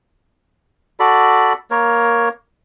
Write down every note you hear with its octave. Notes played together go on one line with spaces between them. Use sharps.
F#4 A4 D5 B5
A#3 A#4 C#5